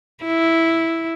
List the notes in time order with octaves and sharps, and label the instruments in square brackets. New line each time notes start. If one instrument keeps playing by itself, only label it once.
[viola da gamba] E4